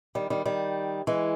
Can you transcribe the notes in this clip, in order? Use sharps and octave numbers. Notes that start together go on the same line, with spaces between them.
D#3 G3
D#3 G3
D#3 G3
E3 G#3